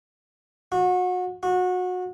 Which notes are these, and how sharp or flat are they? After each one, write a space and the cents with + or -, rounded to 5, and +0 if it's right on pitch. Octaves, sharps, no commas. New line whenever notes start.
F#4 -30
F#4 -25